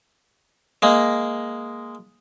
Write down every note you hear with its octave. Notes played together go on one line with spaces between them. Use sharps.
G#3 A#3